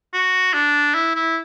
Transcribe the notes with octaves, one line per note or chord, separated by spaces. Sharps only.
F#4
D4
E4
E4